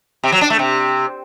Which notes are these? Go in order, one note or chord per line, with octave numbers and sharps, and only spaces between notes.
C3
F#3
D4
A3
C3